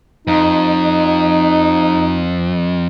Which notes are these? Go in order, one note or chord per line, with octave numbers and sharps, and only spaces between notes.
F2 D#4